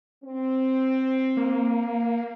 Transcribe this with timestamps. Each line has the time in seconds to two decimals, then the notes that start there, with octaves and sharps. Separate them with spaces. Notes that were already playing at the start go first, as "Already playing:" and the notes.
0.24 C4
1.37 A#3